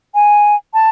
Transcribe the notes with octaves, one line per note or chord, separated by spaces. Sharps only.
G#5
A5